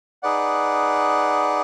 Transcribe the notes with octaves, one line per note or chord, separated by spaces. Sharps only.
D#4 G#4 B4 D5 F#5